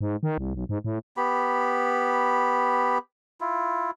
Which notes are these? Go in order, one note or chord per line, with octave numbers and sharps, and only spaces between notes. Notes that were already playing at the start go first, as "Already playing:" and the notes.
G#2
D#3
C2
B1
G#2
A2
B3 G4 B5
E4 F4